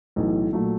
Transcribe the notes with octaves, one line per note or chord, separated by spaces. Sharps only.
B1 A2 E3
A#2 F#3 A3